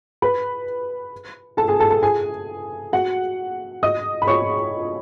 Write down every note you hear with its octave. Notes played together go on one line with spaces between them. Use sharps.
B4 B5
A4 A5
G#4 G#5
A4 A5
A4 A5
G#4 G#5
F#4 F#5
D#5 D#6
B5
C#5 C#6